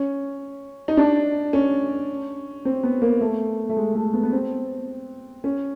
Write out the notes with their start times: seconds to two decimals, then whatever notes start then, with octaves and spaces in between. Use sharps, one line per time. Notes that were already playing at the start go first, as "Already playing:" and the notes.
Already playing: C#4
0.88 D#4
0.97 D4
1.53 C#4
2.65 C4
2.84 B3
3.02 A#3
3.21 A3
3.69 A3
3.77 G#3
3.95 A3
4.13 B3
4.23 B3
4.32 C4
5.44 C#4